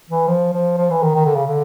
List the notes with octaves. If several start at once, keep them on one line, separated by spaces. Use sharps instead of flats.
E3
F3
F3
F3
E3
D#3
D#3
D3
C#3
D3